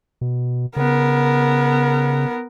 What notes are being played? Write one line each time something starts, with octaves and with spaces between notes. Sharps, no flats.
B2
C#3 B3 A#4